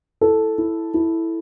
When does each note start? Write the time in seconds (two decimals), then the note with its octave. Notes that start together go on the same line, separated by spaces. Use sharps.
0.21 E4 A4
0.58 E4
0.94 E4